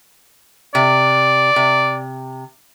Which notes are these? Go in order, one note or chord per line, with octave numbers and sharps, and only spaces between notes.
C3 D5
C3